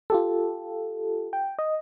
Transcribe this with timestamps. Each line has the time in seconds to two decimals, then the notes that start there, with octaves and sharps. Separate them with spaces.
0.10 F4 G4 A4
1.33 G5
1.59 D#5